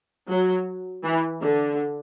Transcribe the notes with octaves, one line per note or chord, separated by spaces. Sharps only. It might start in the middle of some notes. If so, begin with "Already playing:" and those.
F#3
E3
D3